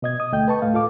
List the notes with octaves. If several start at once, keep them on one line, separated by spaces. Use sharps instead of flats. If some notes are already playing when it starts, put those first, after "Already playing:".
B2 D#5 G#6
D#6
D2 A3 D#5 G5 G6
B4 A5 C#6
A2 A3 F5
F4 A4 F5 D6